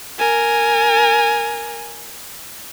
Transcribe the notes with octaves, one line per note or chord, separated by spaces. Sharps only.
A#4 G#5